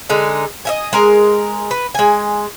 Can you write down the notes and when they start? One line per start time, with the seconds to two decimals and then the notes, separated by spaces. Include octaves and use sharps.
0.10 D3 G#3 D#4
0.65 D#5 E5 G#5
0.93 G#3 A#4 G#5
1.71 B4
1.95 G#3 G#5